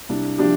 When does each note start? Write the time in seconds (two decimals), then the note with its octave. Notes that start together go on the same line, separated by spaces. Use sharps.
0.09 C2 D4
0.38 C3 F3 D4 G4